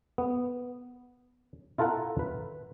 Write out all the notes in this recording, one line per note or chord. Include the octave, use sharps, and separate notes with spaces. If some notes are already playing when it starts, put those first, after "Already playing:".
B3
E4 F4 A4 A#4 F#5
B4